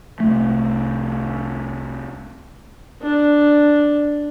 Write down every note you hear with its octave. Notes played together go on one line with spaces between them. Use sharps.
C2 A3
D4